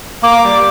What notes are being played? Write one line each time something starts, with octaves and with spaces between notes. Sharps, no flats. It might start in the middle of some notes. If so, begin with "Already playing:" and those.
A#3 D6
G3